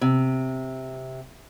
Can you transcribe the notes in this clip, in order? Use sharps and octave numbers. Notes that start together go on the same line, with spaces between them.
C3